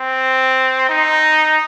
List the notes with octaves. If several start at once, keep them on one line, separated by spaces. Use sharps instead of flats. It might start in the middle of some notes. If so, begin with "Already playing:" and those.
Already playing: C4
D#4